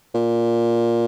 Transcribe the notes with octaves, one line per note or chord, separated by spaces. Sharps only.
A#2